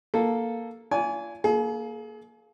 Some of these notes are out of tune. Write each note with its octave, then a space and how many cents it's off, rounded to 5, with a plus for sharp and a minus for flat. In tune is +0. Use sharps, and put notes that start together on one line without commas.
A#3 +0 A4 +0
F4 -45 D5 -40 G#5 +0
A#3 +0 G#4 +40